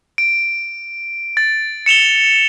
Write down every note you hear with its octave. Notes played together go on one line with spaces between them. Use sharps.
D7
A6
C#7 E7 F7 G7